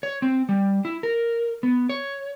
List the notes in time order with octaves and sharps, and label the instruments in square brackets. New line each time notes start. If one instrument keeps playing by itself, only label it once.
[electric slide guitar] C#5
C4
G3
E4
A#4
B3
C#5